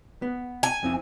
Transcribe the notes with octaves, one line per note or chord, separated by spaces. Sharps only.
B3
G#5
F2 C4 E4